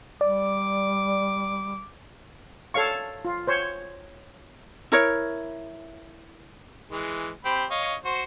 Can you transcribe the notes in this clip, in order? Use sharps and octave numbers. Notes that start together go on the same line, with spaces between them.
G3 D5 D6
A4 C#5 F5 C#6
F4
C5 C#5
E4 A#4 C#5
E3 G#3
C4 G4 B5
C#5 D#5 F5
F#4 C5